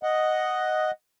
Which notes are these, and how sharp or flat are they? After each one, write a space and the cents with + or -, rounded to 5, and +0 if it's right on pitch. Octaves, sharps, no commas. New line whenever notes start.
D#5 +0 F#5 +0